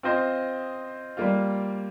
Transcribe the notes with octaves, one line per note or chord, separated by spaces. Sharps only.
C4 F4 C5 D#5
G3 A#3 F4